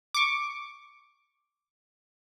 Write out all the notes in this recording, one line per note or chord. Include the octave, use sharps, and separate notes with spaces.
C#6 D6